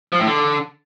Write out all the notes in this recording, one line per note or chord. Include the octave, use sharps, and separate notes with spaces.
F3
A2
D3